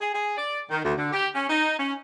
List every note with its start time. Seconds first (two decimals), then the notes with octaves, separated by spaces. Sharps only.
0.01 G#4
0.14 G#4
0.37 D5
0.71 D#3
0.84 D2
0.97 D3
1.13 G4
1.34 C#4
1.50 D#4
1.78 C#4